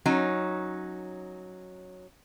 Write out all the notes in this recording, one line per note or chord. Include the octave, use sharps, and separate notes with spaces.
F#3 C#4 D#4